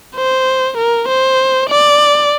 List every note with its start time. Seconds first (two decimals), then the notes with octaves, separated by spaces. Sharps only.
0.16 C5
0.78 A#4
1.08 C5
1.70 D5